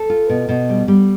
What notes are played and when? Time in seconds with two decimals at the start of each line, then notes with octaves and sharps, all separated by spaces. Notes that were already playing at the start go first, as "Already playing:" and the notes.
Already playing: A4
0.10 F4
0.29 B2
0.49 B2
0.69 G3
0.88 G3